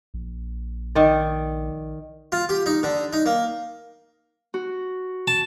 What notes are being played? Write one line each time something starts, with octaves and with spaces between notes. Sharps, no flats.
A#1
D#3 D5
F4
G4
D#4
D3
D#4
A#3
F#4
A5